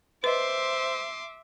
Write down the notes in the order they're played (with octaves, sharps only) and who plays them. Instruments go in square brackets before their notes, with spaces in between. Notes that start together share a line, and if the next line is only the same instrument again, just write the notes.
[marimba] B4 D#5 [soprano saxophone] C5 [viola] E5 [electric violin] C6 D6